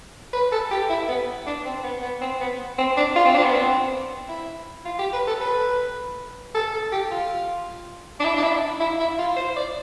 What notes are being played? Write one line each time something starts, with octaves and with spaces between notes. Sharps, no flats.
B4
A4
G4
E4
B3
D4
C4
B3
B3
C4
B3
C4
D4
F4
C4
D4
B3
C4
E4
F4
G4
B4
A4
B4
A4
A4
G4
F4
D4
E4
D4
E4
E4
E4
F4
C5
D5